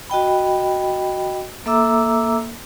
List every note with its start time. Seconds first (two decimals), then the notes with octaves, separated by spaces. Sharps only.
0.10 F#4 D#5 G5 B5
1.66 A#3 A4 E5 A#5 D6 E6